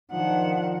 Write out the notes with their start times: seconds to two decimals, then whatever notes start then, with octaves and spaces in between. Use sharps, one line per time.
0.12 D#3 F3 D4 F#5